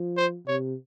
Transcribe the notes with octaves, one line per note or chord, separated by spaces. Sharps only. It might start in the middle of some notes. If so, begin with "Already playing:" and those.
Already playing: F3
C5
C3 C#5